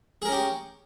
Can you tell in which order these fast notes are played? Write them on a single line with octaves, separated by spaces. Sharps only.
G#4 A#4 C#4 G4